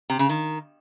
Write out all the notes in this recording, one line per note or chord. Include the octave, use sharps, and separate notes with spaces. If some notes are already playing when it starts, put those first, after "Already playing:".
C3
C#3
D#3